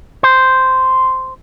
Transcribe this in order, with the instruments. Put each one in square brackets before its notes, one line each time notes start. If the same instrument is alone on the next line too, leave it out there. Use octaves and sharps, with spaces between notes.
[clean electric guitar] C5